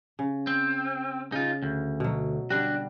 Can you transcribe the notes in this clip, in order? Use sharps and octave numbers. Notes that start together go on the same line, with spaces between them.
C#3
C4
C#3 D#4 F4
D2
B2 F#3
D3 G3 D4 F#4